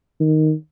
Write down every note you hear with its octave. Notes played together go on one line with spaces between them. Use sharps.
D#3